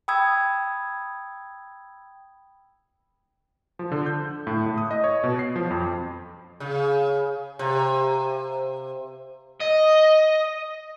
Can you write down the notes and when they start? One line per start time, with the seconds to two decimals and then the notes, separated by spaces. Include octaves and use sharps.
0.08 G5 B5 D#6 E6 G#6
3.79 F3
3.92 D3
4.06 G6
4.47 A2
4.66 A2
4.78 D#6
4.91 D#5
5.04 C#5
5.24 B2
5.39 C7
5.56 F3
5.71 F2
6.60 C#3
7.59 C3
9.61 D#5